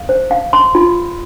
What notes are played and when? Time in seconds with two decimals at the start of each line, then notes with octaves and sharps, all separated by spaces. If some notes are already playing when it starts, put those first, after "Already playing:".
Already playing: F5
0.09 C5
0.31 F5
0.53 C6
0.75 F4